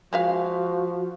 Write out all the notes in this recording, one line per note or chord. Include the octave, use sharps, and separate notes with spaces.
F3 G#3 F#4 E5 F5